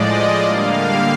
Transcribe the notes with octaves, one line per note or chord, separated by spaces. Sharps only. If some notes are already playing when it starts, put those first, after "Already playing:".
Already playing: A2 F3 G#3 D5 D#5
D3 G3 A#3 F5